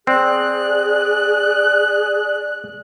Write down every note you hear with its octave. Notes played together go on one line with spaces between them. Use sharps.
C4 G#4 D5 F#6